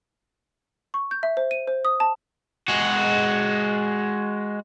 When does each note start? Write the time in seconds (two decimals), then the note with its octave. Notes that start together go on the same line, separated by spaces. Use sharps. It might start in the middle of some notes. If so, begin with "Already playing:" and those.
0.94 C#6
1.11 G6
1.23 E5
1.37 C5
1.51 D#7
1.68 C5
1.85 D#6
2.00 A5
2.68 G#3 F#4